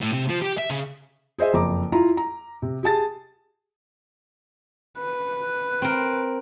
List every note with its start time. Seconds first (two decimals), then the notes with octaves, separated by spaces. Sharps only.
0.01 A2
0.13 C3
0.30 F3
0.42 G4
0.58 E5
0.70 C#3
1.38 G#4 C5 D#5 E5
1.53 F#1 F2 A#5 D6
1.92 E4 F4 A#5
2.17 A#5
2.62 C3
2.83 G4 G#4 A5 A6
4.98 B4
5.82 C4 A#4